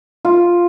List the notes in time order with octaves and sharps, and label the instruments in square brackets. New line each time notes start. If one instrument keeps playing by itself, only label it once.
[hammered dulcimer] F4